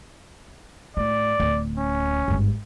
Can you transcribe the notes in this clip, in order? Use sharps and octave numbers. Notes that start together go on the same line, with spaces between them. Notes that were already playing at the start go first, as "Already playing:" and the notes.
A2 D5
D1
C#4
G#1 G2